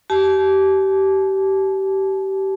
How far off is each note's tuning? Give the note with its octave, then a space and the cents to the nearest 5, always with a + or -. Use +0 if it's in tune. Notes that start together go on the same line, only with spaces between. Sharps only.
G4 -25 A5 -40